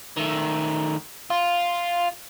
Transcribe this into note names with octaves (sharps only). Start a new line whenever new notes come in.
D#3 A3
F4